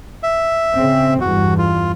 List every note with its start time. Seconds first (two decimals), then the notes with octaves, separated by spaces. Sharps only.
0.23 E5
0.75 C#3 C4
1.21 E2 G2 F#4
1.58 F4